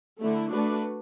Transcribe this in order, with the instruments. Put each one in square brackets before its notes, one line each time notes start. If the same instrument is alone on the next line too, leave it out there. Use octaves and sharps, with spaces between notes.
[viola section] D3 A3 E4
A3 D4 F#4 B4